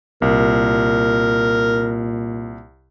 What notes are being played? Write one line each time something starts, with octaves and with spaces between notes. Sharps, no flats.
C2 A#2 A#4